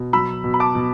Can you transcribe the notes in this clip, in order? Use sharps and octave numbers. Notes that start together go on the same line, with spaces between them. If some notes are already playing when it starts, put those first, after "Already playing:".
Already playing: B2
F#3 B5 E6
B2
B5
A5 D6
B2